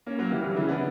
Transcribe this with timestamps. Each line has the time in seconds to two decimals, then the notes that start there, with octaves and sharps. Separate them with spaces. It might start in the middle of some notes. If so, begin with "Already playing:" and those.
0.06 A#3 C#4
0.19 F#3 A#3
0.31 E3 G3
0.43 D3 F#3
0.56 C#3 E3
0.68 B3 D4